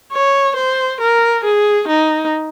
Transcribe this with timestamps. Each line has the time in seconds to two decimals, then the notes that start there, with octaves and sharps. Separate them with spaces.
0.12 C#5
0.56 C5
1.01 A#4
1.44 G#4
1.88 D#4